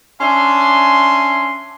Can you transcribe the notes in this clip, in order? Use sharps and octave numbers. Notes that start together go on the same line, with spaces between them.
C#4 D4 E5 G#5 C6